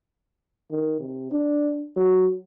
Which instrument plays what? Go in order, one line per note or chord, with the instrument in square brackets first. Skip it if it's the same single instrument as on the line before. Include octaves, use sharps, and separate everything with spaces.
[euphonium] D#3
C3
D4
F#3